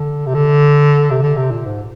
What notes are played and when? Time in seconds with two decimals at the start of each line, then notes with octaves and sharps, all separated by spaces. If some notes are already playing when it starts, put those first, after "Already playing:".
Already playing: D3
0.26 C3
0.34 D3
1.11 C3
1.22 D3
1.37 C3
1.51 A#2
1.66 G#2